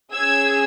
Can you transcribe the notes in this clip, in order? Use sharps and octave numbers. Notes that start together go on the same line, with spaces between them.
C#4 G#4 E6 G#6